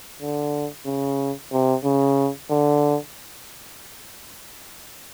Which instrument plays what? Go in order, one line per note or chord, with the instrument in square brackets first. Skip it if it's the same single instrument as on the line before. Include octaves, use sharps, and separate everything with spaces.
[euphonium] D3
C#3
C3
C#3
D3